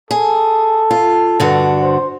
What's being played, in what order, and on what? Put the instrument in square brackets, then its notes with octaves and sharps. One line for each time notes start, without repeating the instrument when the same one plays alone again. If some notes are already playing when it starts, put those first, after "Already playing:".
[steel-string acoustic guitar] G#4 [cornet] A4
[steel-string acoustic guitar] F4
G2 D3 F#4
[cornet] C5